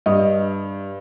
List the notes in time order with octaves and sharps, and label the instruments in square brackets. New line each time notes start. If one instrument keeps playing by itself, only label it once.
[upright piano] G2 [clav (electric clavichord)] D#5